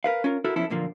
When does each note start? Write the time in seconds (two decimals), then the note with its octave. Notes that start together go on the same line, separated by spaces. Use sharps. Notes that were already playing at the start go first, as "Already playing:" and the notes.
0.04 A#4 B4 F5
0.24 C#4 F4 A#4
0.44 E4 F#4 A4 A#4
0.56 F3 B3 C#4 E4 A4
0.70 B1 A#2 D3 F3 A#3